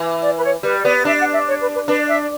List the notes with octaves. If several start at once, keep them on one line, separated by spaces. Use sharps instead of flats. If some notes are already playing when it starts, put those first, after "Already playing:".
Already playing: E3
D5
B4
C#5
G3 B4
B3 D5
D4 E5
F#5
E5
C#5
B4
B4
D4 B4
E5